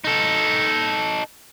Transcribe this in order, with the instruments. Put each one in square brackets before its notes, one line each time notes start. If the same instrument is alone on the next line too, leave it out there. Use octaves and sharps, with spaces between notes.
[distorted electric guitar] D#4 A4